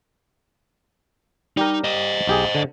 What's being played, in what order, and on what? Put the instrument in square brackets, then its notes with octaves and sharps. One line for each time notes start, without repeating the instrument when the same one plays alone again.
[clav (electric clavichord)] G3 G4 A#4 [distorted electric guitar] D#4
[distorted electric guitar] C5 D#5
[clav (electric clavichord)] B1 G4 G#4
D3